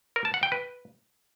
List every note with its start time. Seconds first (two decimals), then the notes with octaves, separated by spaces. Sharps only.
0.16 A#4
0.25 A5
0.34 F#5
0.43 G5
0.52 B4